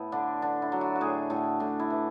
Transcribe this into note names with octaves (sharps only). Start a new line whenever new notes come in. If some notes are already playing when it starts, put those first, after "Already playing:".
Already playing: A2 B3 E4
D3 D4
D3 D4
E4
F#3
F#4
F#4
A2 G#4
A2 A4
A2 D4
E4
E3